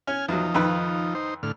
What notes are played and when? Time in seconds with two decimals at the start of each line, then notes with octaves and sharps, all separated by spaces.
0.07 C#4 G#5 F6
0.28 E2 F3 F#3 D#4
0.54 F2 D#3 B4
1.15 D#4 C5
1.43 A2 D3 F6